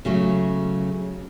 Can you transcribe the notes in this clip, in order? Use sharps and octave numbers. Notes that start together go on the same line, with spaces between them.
C#3 F#3 A3